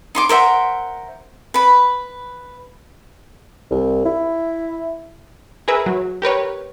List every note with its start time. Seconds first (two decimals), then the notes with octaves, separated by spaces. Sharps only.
0.15 D#4 C6 D6
0.29 A#4 C5 E5 F#5
1.54 B4 B5
3.71 C2
4.05 E4
5.68 G#4 A#4 B4 E5
5.86 F#3
6.22 G4 A#4 B4 C#5